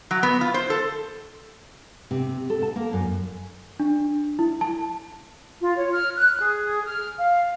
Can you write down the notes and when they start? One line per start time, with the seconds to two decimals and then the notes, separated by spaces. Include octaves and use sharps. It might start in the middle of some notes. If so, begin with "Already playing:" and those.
0.11 F#3
0.23 B3
0.41 F4
0.54 C5
0.70 A4
2.11 C3
2.50 A4
2.62 A5
2.76 A#3
2.93 F#2
3.80 D4
4.39 E4
4.61 A5
5.61 F4
5.77 C#5
5.93 F6
6.17 F#6
6.39 G#4
6.85 F6
7.18 F5